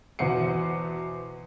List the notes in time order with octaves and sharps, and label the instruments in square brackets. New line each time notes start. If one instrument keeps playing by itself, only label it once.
[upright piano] E2 B2 C5 F#5 C7 C#7